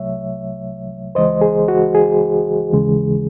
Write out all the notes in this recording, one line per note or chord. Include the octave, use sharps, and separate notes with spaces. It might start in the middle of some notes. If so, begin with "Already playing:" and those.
Already playing: C2 C3 F#3 A3 C#5 E5
C#2 C#3 E3 G#3 C5 D#5
G#4
F#4
G#4
D#2 C#3 E3 G#3